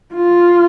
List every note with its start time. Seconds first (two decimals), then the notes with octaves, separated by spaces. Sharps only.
0.14 F4